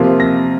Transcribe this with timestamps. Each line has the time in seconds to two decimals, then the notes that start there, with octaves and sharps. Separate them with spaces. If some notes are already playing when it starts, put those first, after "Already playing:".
Already playing: C3 F3 A#3
0.20 A#6